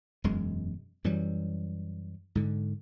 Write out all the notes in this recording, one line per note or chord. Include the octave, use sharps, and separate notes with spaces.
E1 F#2 G#3
F#2 E3 F#3 G3
G#2 D3